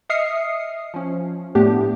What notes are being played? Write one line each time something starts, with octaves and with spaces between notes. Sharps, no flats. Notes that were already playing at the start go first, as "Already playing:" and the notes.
D#5 E5 D#6 F6 C7 C#7
F3 C#4
A2 A3 B3 D4 G4